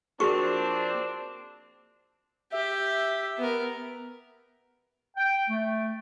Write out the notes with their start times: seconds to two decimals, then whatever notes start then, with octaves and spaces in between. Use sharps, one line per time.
0.20 F3 A#3 C4 D4 F#4 G#4 C#6
2.52 G4 E5
3.37 B3 A#4
5.17 G5
5.49 A3